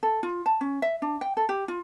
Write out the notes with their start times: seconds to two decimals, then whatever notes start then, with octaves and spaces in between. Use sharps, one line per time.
0.03 A4
0.23 F4
0.46 A5
0.61 C#4
0.82 E5
1.02 D4
1.21 G5
1.37 A4
1.49 G4
1.68 F4